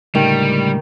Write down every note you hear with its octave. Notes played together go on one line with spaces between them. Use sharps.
C#2 A2 D3 D#3 G3